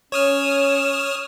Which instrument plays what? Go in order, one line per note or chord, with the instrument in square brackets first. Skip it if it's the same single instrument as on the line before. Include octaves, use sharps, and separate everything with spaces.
[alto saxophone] C#4 [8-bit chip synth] C#5 D#6 F6 [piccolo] E7